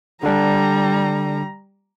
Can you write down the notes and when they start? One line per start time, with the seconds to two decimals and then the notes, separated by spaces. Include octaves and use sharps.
0.23 D3 G3 D4 A#5